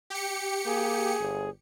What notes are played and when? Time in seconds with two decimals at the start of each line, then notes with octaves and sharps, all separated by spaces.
0.10 G4 C#7
0.66 A#3 G#4
1.20 G1